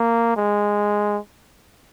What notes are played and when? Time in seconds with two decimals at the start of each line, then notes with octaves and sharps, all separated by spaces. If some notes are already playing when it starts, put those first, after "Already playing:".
Already playing: A#3
0.36 G#3